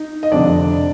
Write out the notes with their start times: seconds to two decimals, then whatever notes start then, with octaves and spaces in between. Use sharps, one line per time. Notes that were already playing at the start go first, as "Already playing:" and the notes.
Already playing: D#4
0.23 D#5
0.32 F1 F2 D3 D4 D5